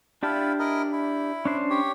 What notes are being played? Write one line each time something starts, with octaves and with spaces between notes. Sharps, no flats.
D4 E4 F4 G4 A5
E4 A#4 D#5
E4
C#4 D4 C5
G4 C#5